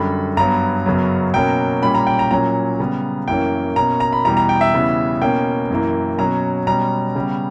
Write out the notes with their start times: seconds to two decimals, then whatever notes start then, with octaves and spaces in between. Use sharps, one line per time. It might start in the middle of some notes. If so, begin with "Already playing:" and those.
Already playing: F#2 D3 G3 B5
0.37 G2 F#3 B3 A#5
0.86 F#2 C#3 F#3 B3
1.34 B2 F#3 A#3 C#4 G5
1.83 A#2 G3 C#4 B5
1.95 A#5
2.07 G5
2.19 A#5
2.31 A#2 F#3 C#4 A#5
2.79 C#3 G3 B3
3.28 F#2 E3 A#3 C#4 G5
3.76 B2 A#3 C#4 A#5
4.00 A#5
4.13 B5
4.25 E2 B2 G3 B3 A#5
4.37 A#5
4.49 G5
4.61 E5
4.73 E2 C#3 G3 B3
5.22 B2 A#3 C#4 G5
5.70 F#2 E3 A#3
6.19 B2 F#3 C#4 A#5
6.67 B2 G3 C#4 A#5
7.15 C#3 G3 B3